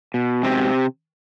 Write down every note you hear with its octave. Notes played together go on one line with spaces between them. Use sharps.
B2
G#2 C3 C4